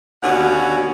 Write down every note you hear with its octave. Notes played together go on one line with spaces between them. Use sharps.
D#2 B2 D3 C#4 F#4 F#5